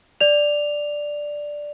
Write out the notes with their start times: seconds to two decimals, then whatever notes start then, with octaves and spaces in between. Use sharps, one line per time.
0.20 D5 F7